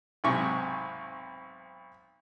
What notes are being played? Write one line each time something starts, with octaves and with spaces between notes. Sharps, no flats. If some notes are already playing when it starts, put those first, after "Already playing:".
B1 G#2 C3 C#6